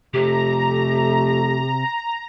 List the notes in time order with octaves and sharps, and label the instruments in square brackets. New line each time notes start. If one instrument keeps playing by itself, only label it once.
[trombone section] F2 A3 [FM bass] C3 [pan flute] G4 [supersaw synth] A#5